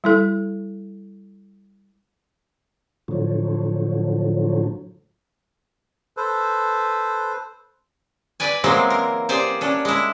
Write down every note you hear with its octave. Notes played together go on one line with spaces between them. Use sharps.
G3 E4 A4
A2 D3 F3 F#3
A4 B4 C5
B4 D5 G#5
E3 F#3 G#3 A#3 C4
A#4
G4 G#4 C5 D5
C#4 D4
G#3 E4